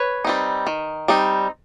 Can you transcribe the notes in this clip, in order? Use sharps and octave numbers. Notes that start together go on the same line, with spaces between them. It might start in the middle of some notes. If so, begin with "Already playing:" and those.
Already playing: B4 C#5
G3 C4 D#4
D#3
G3 C4 D#4